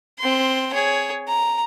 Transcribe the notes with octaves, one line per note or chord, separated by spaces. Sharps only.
C4 C6
G#4 C#5
A#5